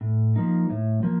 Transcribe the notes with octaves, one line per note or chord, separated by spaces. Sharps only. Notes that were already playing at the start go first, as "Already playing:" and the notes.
A2
F3 A#3 D#4
A2
F3 A#3